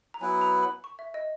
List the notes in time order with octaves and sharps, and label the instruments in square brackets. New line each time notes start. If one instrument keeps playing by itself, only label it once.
[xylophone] A#5
[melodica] F#3 B3 E4 B4 [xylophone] G#5
[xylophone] A#5
B5
C#6
E5
D#5